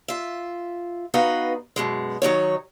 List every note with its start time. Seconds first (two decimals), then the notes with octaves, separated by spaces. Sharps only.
0.08 F4 E5
1.14 B3 D#4 F#4 B4 D#5 F5
1.76 F#2 B2 G#3
2.22 D#3 F#3 D#4 C#5